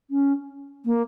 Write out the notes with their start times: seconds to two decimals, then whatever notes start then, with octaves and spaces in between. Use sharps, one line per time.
0.10 C#4
0.85 A#3